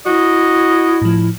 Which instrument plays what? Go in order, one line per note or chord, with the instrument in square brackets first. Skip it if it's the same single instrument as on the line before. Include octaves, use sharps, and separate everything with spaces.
[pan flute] E4 [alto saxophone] F#4 [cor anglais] D#5
[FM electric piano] A2 F3